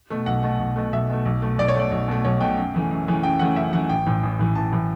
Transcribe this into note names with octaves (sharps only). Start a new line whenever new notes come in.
B2 A3
B1 F#5
B2 A3
B1
B2 A3
B1 E5
B2 A3
B1
B2 A3
B1 D5
C#5
B2 A3 D5
B1
B2 A3
B1 C#5
B2 A3 G5
F#2
C#3 E3 A3
F#2
C#3 E3 A3
F#2 G5
C#3 E3 A3 F#5
F#2 E5
C#3 E3 A3 F#5
A1 G5
A2 E3
A1
A2 E3
A1 A5
A2 E3